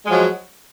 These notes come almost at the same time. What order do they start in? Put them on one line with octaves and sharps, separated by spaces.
G#3 F3 F#3